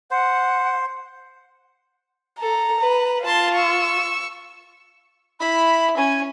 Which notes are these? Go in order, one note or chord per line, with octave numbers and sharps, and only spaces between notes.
C5 F#5
A4 A#5
B4
F4 A5 C6
C#6 E6
E4 B5
C#4 G#5